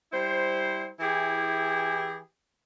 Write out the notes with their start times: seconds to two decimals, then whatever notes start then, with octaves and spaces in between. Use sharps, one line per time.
0.12 G3 E4 C5
0.99 E3 E4 G4 G#4